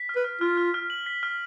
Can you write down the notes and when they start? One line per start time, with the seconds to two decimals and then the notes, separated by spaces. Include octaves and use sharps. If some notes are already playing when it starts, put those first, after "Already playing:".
Already playing: B6
0.09 F6
0.16 B4
0.24 F6
0.41 F4 F6
0.57 F6
0.74 F6
0.90 F#7
1.06 B6
1.23 F6